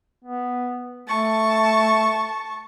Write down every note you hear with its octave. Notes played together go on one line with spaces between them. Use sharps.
B3
A3 A5 C#6